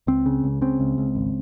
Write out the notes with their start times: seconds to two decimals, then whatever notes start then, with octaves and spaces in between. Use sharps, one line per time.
0.07 C#2 C4
0.26 C#3
0.44 C#2
0.62 C#3 C4
0.80 C#2
0.98 C#2
1.15 G#1